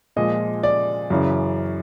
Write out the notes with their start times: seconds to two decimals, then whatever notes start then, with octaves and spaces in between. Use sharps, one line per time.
0.16 A#2 F3 G#3 D#5
0.63 D5
1.10 F#2 C#3 E3